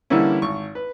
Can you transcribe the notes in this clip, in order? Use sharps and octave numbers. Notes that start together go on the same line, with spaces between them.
D3 E3 G3 A#3 C#4 E4
G#1 C#6
B4